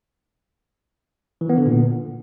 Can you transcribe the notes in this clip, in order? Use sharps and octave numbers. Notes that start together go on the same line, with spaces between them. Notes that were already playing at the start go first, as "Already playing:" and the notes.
E3
B3
D3
A#2